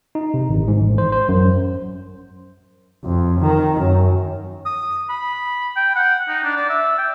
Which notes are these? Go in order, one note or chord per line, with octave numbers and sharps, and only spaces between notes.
D#4
C3
G#1
G#2
A1
C5
C5
F#2
F2
D#3
F#2
D#6
B5
G5
F#5
D#4
D4
D5
E5
G5